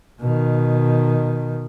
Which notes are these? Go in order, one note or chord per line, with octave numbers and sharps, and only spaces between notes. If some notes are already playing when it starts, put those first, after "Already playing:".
B2 D#3